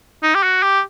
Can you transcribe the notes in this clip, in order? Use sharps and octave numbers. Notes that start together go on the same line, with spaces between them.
D#4
G4
F#4
G4